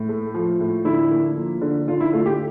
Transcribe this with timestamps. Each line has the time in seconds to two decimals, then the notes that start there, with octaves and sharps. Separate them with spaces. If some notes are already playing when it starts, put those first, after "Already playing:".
Already playing: A2
0.09 A3
0.34 F3
0.60 A2
0.85 D3 E4
1.11 A#3
1.36 F3
1.62 D3
1.88 D3 F4
2.00 E4
2.13 A3 F4
2.26 G4